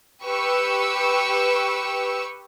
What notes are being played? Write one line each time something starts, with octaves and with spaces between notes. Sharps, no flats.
G4 B4 C#6 E6